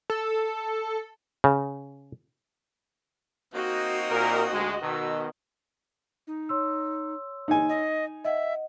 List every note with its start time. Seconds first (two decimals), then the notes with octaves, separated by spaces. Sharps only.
0.10 A4
1.44 C#3
3.54 A#3 C4 D#4 F#4 D#5
4.10 A#2 A#4
4.52 D2 G#3
4.82 B2 D#3 E6
6.27 D#4
6.49 C#5 C6 E6
7.48 D#4 G#5
7.69 D#5
8.24 D#5 E5 F#5